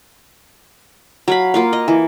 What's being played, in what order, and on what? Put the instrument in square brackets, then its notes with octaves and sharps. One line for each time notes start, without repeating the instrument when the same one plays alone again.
[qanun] F#3 F5 B5
A#3 F4 F5
D#5
E3